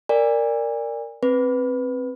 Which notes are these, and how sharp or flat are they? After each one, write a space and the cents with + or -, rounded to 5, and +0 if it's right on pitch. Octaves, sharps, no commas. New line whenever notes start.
A#4 -10 D5 +0 G#5 -35
C4 +15 B4 +0